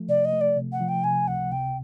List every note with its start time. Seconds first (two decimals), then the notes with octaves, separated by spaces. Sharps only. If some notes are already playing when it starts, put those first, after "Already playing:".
Already playing: F3 A3
0.08 C3 D5
0.25 D#5
0.33 A3
0.41 D5
0.56 C3
0.72 F#5
0.81 F3
0.88 G5
1.04 C3 G#5
1.28 C#2 F#5
1.52 C3 G5